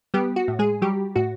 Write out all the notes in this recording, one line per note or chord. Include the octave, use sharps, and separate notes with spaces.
G3 B3 G4
F#4
A2
G#3 G#4
F#3 G3 G4
A2 F#4